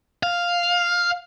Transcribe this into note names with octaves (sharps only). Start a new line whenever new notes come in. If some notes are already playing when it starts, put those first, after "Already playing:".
F5